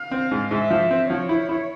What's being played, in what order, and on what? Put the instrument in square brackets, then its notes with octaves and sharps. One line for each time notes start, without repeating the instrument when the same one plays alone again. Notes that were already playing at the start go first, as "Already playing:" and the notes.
Already playing: [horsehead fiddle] F5
[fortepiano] C4
G#2
[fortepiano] G#2 [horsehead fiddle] E5
[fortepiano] F3
C4
[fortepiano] F3 [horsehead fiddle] C#5
[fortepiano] E4
E4